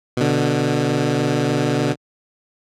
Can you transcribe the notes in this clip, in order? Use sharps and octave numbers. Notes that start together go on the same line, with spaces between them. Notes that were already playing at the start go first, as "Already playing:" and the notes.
B2 D3